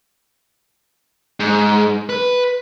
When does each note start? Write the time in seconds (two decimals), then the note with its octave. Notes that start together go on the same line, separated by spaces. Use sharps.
1.40 G#2
2.09 B4